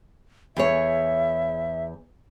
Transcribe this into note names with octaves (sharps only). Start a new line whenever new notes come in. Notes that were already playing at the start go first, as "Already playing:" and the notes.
E2 G#4 C#5 E5